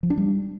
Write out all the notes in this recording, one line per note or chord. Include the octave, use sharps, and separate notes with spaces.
F3
D4
G3